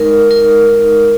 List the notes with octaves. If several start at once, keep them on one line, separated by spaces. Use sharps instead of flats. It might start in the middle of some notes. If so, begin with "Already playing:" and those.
Already playing: G#3 D#4 A#4
A#4